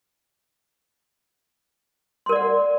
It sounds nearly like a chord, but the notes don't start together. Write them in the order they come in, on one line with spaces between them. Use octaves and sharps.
C6 A#4 D5 F#5